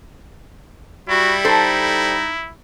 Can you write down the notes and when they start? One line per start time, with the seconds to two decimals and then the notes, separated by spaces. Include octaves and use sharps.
1.09 G3 E4 F#4
1.45 D#4 A4 C5